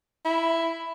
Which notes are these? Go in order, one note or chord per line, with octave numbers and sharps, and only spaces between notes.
E4